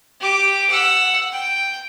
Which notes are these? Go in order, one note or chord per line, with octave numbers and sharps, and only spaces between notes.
G4 D6
F#5 E6
G5